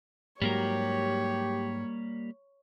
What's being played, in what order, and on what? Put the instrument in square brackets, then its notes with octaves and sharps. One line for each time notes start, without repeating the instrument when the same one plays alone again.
[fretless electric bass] G#2 F#3 [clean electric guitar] G3 A#3 A#4 [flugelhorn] G4 [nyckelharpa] C#5